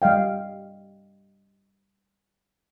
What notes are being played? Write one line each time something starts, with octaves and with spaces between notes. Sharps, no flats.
G3 D#5 F5 G5